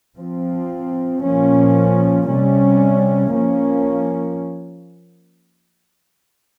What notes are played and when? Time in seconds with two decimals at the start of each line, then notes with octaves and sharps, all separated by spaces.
0.17 F3 C4
1.22 A#2 F3 A#3 C#4
2.27 C3 G3 C#4
3.32 F3 A#3 C#4